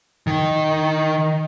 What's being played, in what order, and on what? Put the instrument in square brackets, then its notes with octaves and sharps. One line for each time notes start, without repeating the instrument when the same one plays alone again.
[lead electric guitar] D#3